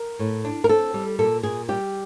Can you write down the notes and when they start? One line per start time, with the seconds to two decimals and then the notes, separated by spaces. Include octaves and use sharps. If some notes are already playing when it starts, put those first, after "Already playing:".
Already playing: A#4
0.19 A2
0.45 D4
0.64 A#4
0.69 C4 A4
0.94 G3
1.19 A#2 A4
1.43 A#2 G#4
1.69 G3 G4